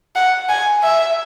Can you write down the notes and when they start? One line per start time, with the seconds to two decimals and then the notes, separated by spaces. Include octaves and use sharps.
0.16 F#5
0.49 G#5
0.83 E5